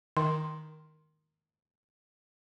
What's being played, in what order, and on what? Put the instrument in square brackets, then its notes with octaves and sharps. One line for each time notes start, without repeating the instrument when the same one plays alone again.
[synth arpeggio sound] D#3 [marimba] C6